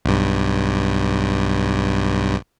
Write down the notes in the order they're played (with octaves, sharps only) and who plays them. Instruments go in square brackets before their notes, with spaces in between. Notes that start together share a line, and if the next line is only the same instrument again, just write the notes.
[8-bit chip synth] B1 G2